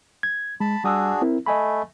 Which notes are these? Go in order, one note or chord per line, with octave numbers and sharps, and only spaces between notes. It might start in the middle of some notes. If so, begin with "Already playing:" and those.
G#6
G#3 A5 B5
G3 D4 F#4 G#4 D#6 E6
C4 E4 A#4
A3 D#5 G#5 B5